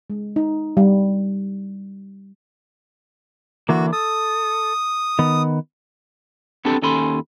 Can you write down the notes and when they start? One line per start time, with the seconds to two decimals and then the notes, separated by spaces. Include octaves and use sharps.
0.10 G#3
0.36 D#4
0.77 G3
3.69 D3 E3 A#3 F#4
3.93 A4 D#6
5.19 D#3 B3
6.65 B3 C4 D4 G4 A4
6.82 D#2 C#4 A4 G#5 B5 C6